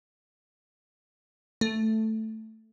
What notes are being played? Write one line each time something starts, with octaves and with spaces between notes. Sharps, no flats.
A3